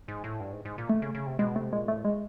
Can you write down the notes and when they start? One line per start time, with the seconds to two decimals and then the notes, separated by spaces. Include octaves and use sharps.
0.08 G#2
0.24 A2
0.40 G2
0.52 G#2
0.65 G#2
0.78 A#2
0.89 A3
1.02 C#3
1.15 C#3
1.26 C3
1.39 B2 G#3
1.55 C3 A3
1.73 A#2 G#3
1.88 A2 A3
2.05 G#3